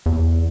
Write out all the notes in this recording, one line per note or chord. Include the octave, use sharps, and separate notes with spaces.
E2